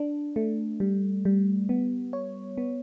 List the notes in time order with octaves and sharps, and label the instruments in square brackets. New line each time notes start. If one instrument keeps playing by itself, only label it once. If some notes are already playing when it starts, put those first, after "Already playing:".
Already playing: [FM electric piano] D4
A3
G3
G3
B3
C#5
B3